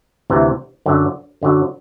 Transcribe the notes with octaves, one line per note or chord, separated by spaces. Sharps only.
D2 C3 E3
F#2 D3 F#3
F#2 D3 F#3